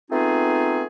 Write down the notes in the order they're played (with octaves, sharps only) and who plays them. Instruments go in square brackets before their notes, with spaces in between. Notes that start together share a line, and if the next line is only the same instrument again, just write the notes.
[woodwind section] A3 B3 C4 D#4 F4 G#4